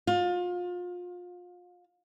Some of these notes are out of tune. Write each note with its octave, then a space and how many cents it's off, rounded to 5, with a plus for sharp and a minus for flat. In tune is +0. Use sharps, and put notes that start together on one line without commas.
F4 +30